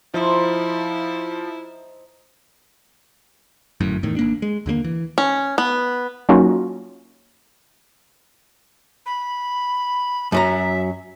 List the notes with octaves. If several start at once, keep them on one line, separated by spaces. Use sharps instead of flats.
F3 D#4 E4 C5
G1 F#2 A2
E2 A2 D#3
G#1 A#3 D4
G#3
D#2 D3 G3 A#3
E3
C#4
B3
F#3 A#3 C#4 D#4 F4 F#4
B5
F#2 F#3 E5 A#5